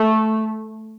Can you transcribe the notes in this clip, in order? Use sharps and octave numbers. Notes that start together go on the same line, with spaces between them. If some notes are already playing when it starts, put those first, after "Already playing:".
Already playing: A3